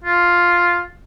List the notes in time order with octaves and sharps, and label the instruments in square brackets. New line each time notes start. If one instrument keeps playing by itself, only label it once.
[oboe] F4